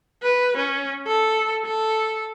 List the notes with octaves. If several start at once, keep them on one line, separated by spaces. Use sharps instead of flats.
B4
C#4
A4
A4